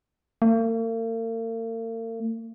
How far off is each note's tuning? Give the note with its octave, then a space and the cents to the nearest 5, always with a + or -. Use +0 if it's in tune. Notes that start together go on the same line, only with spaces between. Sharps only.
A#3 -45